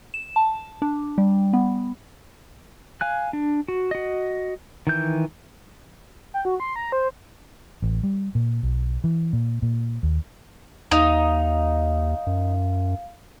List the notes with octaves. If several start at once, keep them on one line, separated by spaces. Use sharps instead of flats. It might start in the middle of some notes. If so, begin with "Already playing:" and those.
E7
A5
D4
G3
B3
F5 G#5 F#6
D4
F#4
F#4 D#5
D#3 E3 G6
G5
F#4
C6
A#5
C5
A1
G3
A#2
B1
E3
A#2
A#2
D#2
D#2 D#4 F5
F#2